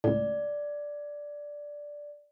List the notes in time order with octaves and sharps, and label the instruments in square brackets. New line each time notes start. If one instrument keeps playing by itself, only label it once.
[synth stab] C#2 A2 [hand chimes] D5